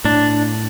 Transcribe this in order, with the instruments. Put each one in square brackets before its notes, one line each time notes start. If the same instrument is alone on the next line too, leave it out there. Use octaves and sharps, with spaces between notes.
[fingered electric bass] A2 [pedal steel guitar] D4